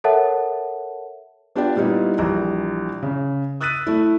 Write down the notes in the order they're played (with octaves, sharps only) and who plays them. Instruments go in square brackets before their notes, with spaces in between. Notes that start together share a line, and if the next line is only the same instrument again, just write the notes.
[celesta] A4 A#4 C#5 E5 F#5 A5
[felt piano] B3 D4 F4 G4 D5 G5
A#2 G3 A#3 B3 D#4 E4
A#1 E3 G3 A#5
C#3
D#6 E6 F#6 A6 B6 D#7
A3 E4